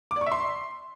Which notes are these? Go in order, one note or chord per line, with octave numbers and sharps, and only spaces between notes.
D6
D5
C#6
E5
C6